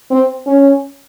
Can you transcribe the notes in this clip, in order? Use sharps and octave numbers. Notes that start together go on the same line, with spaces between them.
C4
C#4